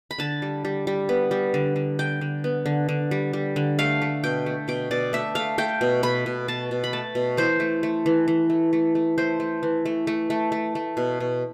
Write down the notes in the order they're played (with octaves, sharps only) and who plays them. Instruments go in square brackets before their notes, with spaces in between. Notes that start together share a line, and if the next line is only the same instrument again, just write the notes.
[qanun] B5
D3 A5
G3
G3
G3
B3
G3
D3
D3
D3 G5
D3
B3
D3
D3
G3
G3
D3
A3 F5
A3
B2 G5
A3
B2 G5
B2 D5
A3 E5
A3 F5
A3 G5
B2
B2 B5
B2
B2 A5
B2
B5
A3 A5
B2
E3 C5
A3
A3
E3
E3
A3
A3
A3
A3 C5
A3
E3
A3
A3
A3
A3
A3
B2
B2